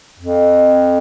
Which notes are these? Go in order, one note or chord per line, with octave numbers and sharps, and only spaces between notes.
F2